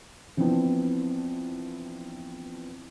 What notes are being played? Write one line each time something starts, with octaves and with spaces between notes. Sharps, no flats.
E3 F3 B3 C4 D4 E4